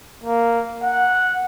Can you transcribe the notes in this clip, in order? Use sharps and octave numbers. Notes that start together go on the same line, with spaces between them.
A#3
F#5